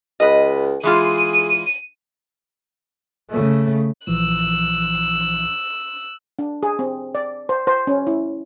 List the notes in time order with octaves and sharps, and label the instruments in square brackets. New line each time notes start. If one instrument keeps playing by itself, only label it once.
[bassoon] C#2 [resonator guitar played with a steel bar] B4 D#5
[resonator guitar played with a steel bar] E3 G#3 F4 [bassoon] G#4 [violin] D#7
[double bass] C#3 A3
[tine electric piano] A#1 E3 F3 [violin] E6 F#6
[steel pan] D4
G#4
C4
D5
C5
C5
C#4
E4